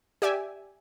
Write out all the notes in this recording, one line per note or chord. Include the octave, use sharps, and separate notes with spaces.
G4 D5 E5 G#5